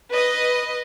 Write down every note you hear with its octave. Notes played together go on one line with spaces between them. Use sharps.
B4 D#5